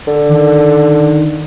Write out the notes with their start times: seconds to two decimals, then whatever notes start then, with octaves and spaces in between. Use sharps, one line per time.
0.07 D3
0.29 D#3